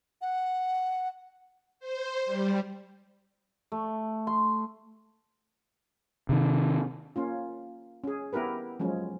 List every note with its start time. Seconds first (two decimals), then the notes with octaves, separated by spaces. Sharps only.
0.22 F#5
1.80 C5
2.26 G3
3.72 A3
4.27 C6
6.29 C3 D#3
7.16 A#3 C#4 F4
8.04 C#4 G#4
8.33 B3 E4 G4 A#4 B4
8.80 F3 F#3 G#3 C#4